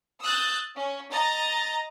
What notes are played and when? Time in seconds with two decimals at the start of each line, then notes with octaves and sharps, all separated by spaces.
0.22 D#6 E6 F#6 G6 A6
0.74 C#4
1.12 D#5 A#5 A6